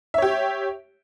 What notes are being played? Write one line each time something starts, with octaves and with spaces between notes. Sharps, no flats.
G4 C#5 E5